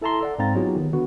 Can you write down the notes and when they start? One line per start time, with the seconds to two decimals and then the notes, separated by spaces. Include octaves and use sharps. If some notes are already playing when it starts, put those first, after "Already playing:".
0.02 E4 A4 E5 A5 A#5 C6
0.21 A4 D5 F#5
0.38 G#2 C4 F5 A#5 A6
0.55 F#3 B3 D#4 F4 G4 G#4
0.76 D#3 B3
0.93 D3 B3 F#4